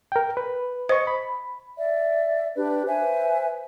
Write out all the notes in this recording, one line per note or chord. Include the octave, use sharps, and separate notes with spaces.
A#4 G5
B4
C5 D#5 C#6
B5
D5 E5
D4 G4 B4
B4 C5 E5 G#5